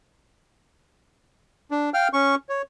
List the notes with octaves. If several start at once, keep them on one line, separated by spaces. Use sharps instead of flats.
D4
F5 G5 F6
C#4 C#6
C#5